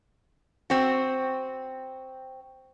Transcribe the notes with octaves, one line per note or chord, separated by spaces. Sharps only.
C4 F#4